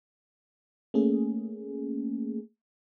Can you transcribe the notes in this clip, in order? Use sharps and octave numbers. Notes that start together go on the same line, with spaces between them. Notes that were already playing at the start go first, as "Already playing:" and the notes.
A3 A#3 C#4 G#4